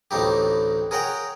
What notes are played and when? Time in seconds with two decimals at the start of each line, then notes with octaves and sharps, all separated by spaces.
0.11 A1 D2 A2 D#4 G4
0.91 G#4 A#4 C#5 F#5 G5 A#5